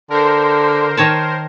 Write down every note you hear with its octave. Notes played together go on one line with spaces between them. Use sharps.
D3 A#4 C5
D#3 C#5 A5